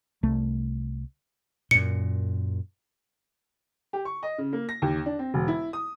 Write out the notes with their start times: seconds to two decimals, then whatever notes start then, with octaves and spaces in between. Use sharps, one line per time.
0.23 C2 A3
1.71 F#2 A#2 C#7
3.93 G4
4.05 C#6
4.23 D#5
4.38 C#3
4.53 A#3
4.69 A#6
4.82 D#2
5.06 D4
5.19 C4
5.34 E1
5.48 E4
5.73 D#6